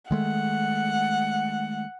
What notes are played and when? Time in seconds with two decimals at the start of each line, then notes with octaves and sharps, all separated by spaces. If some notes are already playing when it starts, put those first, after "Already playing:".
0.11 D#3 G#3 A3 F#5